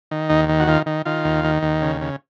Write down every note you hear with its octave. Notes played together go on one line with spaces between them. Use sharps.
D#3
D#2 D#4
D#3
F#4
D#3 F4
D#3
D#3 F4
D#2
D#3
D#2
C#3
C#3